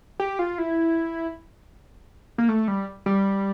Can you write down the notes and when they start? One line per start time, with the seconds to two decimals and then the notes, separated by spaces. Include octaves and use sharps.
0.20 G4
0.39 F4
0.58 E4
2.38 A#3
2.49 A3
2.68 G3
3.06 G3